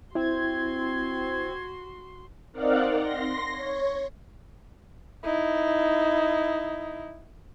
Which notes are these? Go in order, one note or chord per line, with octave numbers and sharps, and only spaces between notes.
C4 E4 F#4 C6 G#6
C4 D#4 A#4 D5 F5 F#5
C6 A#6
C#5
D#4 E4